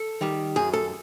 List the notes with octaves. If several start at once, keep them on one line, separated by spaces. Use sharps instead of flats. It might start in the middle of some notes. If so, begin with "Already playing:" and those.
Already playing: A4
D#3 G3
F#2 G#4
A4